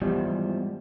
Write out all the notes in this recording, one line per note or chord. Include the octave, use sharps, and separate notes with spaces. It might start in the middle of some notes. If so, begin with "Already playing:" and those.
E2 G#2 F3 G3